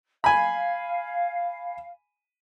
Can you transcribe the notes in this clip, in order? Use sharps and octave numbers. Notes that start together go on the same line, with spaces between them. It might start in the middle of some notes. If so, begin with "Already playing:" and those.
F5 G#5 B5